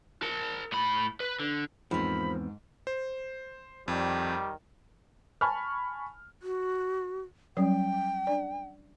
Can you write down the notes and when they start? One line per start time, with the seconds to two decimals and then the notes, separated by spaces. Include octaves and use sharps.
0.22 A#4 A5
0.72 A2 B5
1.20 B4
1.40 D3
1.91 E2 G#2 F3 A#3 C4 B5
2.87 C5
3.88 F2 D#3 G3
5.41 G#5 A5 B5 C#6 F6
6.43 F#4
7.57 F#3 G3 C#4 G5
8.27 D4 D5